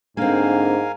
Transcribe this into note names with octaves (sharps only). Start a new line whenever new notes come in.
G#2 D3 A#3 C4 A#4 F5 G#5